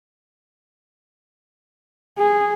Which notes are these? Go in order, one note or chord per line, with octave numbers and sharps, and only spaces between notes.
G#4